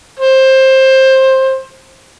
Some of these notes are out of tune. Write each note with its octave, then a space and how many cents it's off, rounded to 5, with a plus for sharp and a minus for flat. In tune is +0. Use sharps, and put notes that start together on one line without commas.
C5 +15